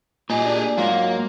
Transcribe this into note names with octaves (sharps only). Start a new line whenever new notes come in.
A#2 D#4 G4 G#4
D4
G#2 F#3 A#3 F4